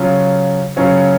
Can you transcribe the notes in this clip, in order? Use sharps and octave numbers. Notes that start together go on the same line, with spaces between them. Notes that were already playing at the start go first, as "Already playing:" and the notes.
Already playing: C#3 F#3 C#4 F4
C#3 F#3 C#4 F4